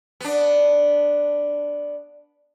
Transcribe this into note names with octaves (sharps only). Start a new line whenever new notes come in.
B3 D4